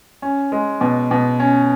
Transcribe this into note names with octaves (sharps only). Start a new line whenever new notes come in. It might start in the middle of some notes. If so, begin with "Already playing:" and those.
C#4
G#3
B2
B2
C#4